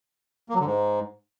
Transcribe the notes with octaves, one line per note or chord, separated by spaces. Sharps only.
A#3
F#3
D3
G#2